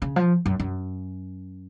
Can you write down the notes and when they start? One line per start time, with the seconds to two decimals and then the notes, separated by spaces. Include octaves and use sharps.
0.02 C#3
0.16 F3
0.46 F#2
0.60 F#2